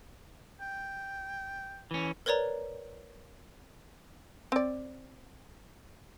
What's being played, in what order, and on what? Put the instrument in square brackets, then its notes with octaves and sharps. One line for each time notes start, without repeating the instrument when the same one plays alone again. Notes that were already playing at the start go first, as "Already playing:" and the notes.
[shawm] G5
[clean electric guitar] E3 C#4
[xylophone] A#4 B4 C#5 D5 A#5
[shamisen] C4 D5